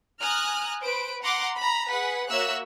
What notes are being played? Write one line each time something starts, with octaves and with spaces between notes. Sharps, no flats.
G#5 A#5 D#6 F6 F#6
B4 C5 D7
F#5 A#5 C6 D6
A#5 B5
G#4 B4 F#5 B6
A#3 F#4 C#5 E5 E6 F#6